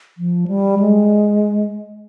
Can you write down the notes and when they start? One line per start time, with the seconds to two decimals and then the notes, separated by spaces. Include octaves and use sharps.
0.18 F3
0.48 G3
0.79 G#3